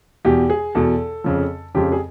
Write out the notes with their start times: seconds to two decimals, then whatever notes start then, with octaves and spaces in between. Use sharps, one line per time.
0.25 E2 B2 G4
0.50 G#4
0.75 E2 B2 A4
1.24 F2 C#3 F3
1.75 F2 C#3 F3 G4
1.92 G#4